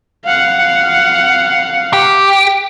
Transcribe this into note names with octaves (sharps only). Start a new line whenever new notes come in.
F5 F#5
G4